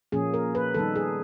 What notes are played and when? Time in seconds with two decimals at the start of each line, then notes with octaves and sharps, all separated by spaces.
0.12 A#2 F3 A#3 C#4 G#4
0.34 A#4
0.55 B4
0.74 D#3 G3 B3 D#4 A4
0.96 G#4